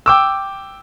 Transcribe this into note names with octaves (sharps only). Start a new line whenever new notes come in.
G5 D6 E6